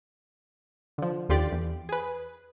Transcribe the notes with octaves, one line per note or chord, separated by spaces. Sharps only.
D3 F3
D#2 D3 F4 G4 D5
E2
G#4 B4